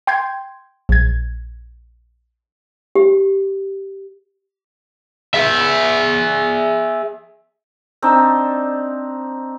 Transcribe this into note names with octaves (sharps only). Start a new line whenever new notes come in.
G5 C6 G6 G#6
A#1 G#6
G4
G#4 E5
C4 D4 D#4 A5